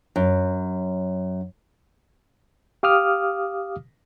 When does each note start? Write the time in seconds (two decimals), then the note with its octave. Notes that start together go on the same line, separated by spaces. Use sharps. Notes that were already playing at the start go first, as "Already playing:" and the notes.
0.16 F#2
2.83 G4 F5 D6 D#6 F6